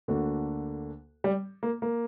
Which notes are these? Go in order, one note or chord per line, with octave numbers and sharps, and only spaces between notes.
D2 D3 A#3 D4 F#4
G3
A#3
A#3